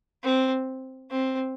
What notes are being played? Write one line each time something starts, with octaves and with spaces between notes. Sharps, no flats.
C4
C4